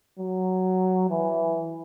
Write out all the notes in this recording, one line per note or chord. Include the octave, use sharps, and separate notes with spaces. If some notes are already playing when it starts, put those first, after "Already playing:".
F#3
E3